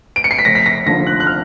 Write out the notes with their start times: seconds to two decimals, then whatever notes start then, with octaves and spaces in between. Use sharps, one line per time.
0.16 D7
0.24 C#7
0.31 C7
0.39 B6
0.45 F1 A#6
0.55 B6
0.66 A#6
0.86 D#2 D3 F3 A#6
1.07 F#6
1.20 F#6
1.27 F6